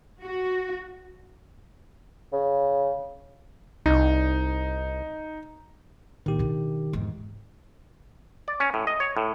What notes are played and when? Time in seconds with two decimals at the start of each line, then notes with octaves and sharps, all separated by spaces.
0.22 F#4
2.33 C#3
3.86 C2 D#4
6.26 A#1 D#3 G4
6.39 B2 D4
6.93 E2 G#2
8.48 D5
8.60 C#4
8.74 A2
8.87 D#5
9.00 C#5
9.17 A2